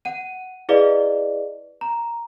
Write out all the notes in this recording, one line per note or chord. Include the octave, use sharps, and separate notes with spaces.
F#5 D#7
E4 G#4 B4 D5 D#5 F5
A#5